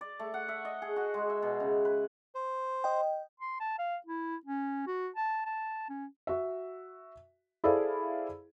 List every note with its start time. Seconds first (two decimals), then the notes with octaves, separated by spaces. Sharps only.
0.01 D5
0.19 A3
0.34 F#5
0.49 E5
0.65 D#5
0.82 G#4
0.96 F#4
1.14 G#3
1.30 E5
1.42 B2
1.60 C#3
1.85 B4
2.35 C5
2.84 D#5 G5
3.40 C6
3.60 A5
3.79 F5
4.07 E4
4.46 C#4
4.87 F#4
5.16 A5
5.46 A5
5.89 C#4
6.27 F#4 E5
7.64 E4 G#4 A4 C5 D5 F5